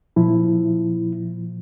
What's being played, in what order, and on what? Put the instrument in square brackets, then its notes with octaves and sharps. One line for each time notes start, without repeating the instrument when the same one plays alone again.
[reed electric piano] A#2 F3 E4